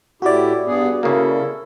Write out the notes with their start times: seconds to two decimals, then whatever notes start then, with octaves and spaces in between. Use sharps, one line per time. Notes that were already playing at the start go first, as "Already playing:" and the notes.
0.22 A2 E4 F#4 G4 D5
0.66 G2 B3 G#4
1.03 C#3 A#3 E4 A4